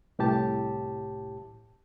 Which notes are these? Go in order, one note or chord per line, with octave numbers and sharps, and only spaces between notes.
C2 A2 G4 A5